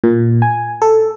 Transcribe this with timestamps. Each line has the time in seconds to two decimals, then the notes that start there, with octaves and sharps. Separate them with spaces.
0.04 A#2
0.42 G#5
0.82 A4